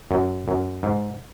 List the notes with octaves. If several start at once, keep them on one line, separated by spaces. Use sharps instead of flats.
F#2
F#2
G#2